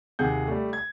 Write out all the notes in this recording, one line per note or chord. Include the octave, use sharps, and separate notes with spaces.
D#2 C3 G#4 F#5 G6
G3 A3
G#6